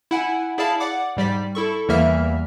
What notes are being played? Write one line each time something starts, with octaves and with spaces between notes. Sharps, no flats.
E4 F#5 G#5
E4 G#4 D5 F5 A5 B5
D5 F#5 D6
G#2 G3 D5 B6
E4 A4 C#6
E2 E3 G3 A#3 E5 F6